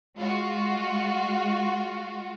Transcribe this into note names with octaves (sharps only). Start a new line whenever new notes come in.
G#3 F4 F#4